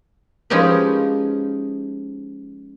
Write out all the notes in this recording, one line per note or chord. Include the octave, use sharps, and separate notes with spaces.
F3 G#3 C#4 D#4 G4 B4